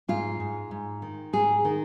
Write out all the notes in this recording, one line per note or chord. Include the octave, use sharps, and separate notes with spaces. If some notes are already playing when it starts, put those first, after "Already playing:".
G#2 F4
G#2
G#2
D#3
G#2 G#4
D#3